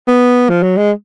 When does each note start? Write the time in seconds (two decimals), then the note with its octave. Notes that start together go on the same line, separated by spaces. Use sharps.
0.07 B3
0.49 F3
0.63 F#3
0.77 G#3